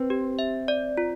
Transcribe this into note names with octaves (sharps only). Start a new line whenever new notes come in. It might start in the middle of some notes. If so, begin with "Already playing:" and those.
Already playing: C4 B4
G4
E5
D5
F4